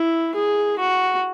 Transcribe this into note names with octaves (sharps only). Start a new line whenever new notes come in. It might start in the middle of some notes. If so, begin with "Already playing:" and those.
Already playing: E4
G#4
F#4